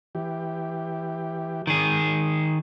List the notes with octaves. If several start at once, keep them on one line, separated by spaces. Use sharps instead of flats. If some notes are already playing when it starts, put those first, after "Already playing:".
E3 G4
D#3 G#4